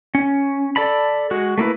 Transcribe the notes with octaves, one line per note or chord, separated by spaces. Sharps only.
C#4
A4 D5 A5 B5
G#3 F#4
A3 A#3 E4 B4